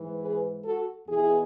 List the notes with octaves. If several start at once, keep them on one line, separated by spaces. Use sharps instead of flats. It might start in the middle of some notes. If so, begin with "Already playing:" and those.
Already playing: G#2 E3
G#4 B4
F#4 A4
E2 B2 E4 G#4